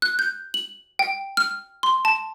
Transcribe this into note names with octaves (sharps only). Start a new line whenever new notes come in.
F#6
G6
F#7
G5
F6
C6
A5